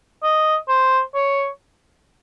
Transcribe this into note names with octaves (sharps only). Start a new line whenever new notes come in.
D#5
C5
C#5